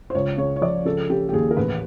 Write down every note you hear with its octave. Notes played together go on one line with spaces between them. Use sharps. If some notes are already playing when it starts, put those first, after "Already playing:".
C5
C#2 C#5
C#3 C#5
C#5
F3 D5
C#3 A4
C#3 G4
G4
D#2 G#4
A#4
A1 B4